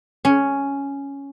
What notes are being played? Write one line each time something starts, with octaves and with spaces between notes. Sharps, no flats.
C#4